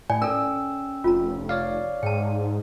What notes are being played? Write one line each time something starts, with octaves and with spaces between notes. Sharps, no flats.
A2 D5 G#5
C#4 A4 A#4 G5 E6
F1 F4 A#5
C#5 D5 F5
G#2 G5 A5